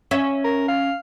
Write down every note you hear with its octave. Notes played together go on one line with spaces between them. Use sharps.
C#4 E5
A#4
F5